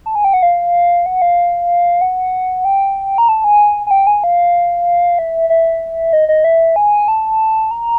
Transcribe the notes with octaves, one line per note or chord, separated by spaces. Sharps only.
A5
G#5
G5
F#5
F5
F#5
F5
F#5
G5
A#5
A5
G#5
G#5
G5
G#5
F5
E5
E5
D#5
D#5
E5
G#5
A5
A#5